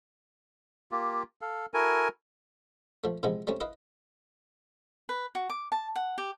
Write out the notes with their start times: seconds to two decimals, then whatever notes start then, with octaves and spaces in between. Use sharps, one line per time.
0.92 A#3 F4 G4
1.41 A4 F5
1.74 E4 F#4 A4 A#4 G#5
3.04 F3 A3
3.23 C3 E3 F3 G#3 B3
3.47 G3 A3 C4 C#4
3.60 E4 B4 D#5 F5
5.09 B4
5.35 F#4
5.50 D6
5.72 A5
5.96 F#5
6.18 G4